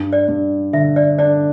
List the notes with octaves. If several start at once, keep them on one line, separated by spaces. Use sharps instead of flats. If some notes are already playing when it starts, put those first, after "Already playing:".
Already playing: G2
D5
G2
D3 E5
D5
D4 D5